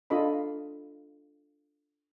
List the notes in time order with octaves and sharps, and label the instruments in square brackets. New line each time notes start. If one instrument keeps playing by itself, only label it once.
[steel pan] D4 F4 A4 D#5 B5